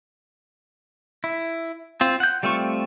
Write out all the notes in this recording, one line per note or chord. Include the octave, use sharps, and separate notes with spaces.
E4
C4 F4
F#5 G6
G3 A3 C4 F4 C#6